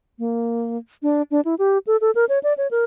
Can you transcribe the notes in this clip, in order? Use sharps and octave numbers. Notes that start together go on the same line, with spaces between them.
A#3
D4
D4
E4
G4
A4
A4
A#4
C#5
D5
C#5
A#4